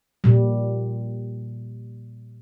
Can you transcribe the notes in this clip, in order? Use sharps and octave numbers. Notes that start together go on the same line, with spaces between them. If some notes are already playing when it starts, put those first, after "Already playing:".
A#2 G3